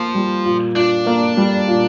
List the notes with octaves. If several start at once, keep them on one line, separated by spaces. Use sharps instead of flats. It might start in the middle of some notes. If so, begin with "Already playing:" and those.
Already playing: F3 A#3 F4
G3
A#2
D4 F4
A#3
G3
A#2